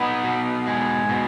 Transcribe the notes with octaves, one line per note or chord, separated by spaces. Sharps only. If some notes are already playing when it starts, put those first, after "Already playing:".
Already playing: B3 D#4
B2
G#3
B2